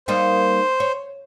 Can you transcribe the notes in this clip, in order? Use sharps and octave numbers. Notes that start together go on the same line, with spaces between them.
G3 A#3 D#4 C5
C#5